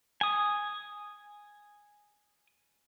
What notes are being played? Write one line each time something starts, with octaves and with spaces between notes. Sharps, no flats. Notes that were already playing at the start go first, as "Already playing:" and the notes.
G#5 D#6